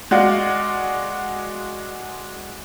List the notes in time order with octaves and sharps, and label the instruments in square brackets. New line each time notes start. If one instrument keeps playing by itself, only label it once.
[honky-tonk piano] G#3 F#4 D5 F5